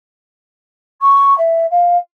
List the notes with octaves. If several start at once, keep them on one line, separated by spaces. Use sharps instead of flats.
C#6
E5
F5